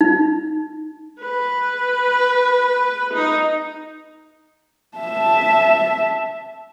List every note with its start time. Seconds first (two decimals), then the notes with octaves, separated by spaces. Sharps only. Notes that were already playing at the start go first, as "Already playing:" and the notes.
0.01 D#4
1.21 B4
3.13 D#4
4.98 E5 A5